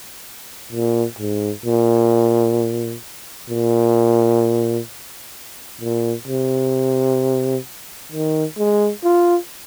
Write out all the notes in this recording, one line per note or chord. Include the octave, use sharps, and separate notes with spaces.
A#2
G#2
A#2
A#2
A#2
C3
D#3
G#3
F4